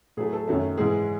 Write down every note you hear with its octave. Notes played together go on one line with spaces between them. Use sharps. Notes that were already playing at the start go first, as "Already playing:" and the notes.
A2 F#3 A3 G#4
A4
F#2 D#3 F#3 A3
G#2 E3 G#3 G#4